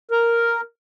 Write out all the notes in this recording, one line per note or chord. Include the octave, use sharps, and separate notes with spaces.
A#4